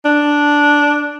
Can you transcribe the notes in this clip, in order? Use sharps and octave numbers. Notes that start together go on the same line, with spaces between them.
D4